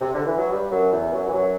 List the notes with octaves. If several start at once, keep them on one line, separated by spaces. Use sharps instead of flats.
C3
D3
E3
F#3
G2 G3
F#2 F#3
E2 E3
F#2 F#3
E3
F#2 F#3